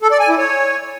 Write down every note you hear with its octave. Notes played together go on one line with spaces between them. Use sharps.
A4
D5
G#5
E4
C#5